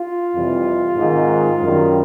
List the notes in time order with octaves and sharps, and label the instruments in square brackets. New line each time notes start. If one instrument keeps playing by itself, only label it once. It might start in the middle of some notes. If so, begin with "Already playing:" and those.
Already playing: [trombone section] F4
F2 C3 E3 G3
G#2 D#3 G#3 C4
F#2 D#3 G3